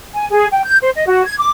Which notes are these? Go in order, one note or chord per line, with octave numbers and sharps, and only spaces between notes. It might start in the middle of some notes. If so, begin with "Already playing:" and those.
G#5
G#4
G5
G6
C5
D#5
F#4
G#6
D6